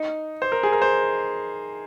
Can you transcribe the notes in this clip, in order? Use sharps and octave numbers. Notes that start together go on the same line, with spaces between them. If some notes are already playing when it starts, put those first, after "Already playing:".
Already playing: D#4
C5
A#4
G#4
A#4
C5